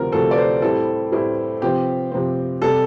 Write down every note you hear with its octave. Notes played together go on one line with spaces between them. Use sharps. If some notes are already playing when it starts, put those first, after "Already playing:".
Already playing: D2 C3 F3 C4 A#4
D2 C3 F3 C4 A4
D5
C5
A2 G3 C4 E4 A4
A2 G3 C4 E4
C3 F3 C4 G4
C3 F3 C4
C3 G3 A4